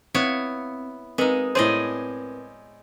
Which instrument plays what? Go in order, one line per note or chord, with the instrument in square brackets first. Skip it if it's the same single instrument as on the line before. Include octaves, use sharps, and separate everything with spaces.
[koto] B3 E4 C#5 [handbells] C4
[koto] G#3 D#4 [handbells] C4 A#4 B4
[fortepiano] A2 C5 [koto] G#4 D5 D#5